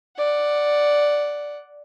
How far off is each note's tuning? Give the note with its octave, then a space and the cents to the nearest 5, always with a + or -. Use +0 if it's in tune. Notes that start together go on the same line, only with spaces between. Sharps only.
D5 +0 F#5 +0